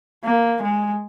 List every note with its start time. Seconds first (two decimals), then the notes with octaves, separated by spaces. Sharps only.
0.24 A#3
0.62 G#3